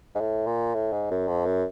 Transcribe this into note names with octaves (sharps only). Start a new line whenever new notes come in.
G#2
A2
A#2
A2
G#2
F#2
F2
F#2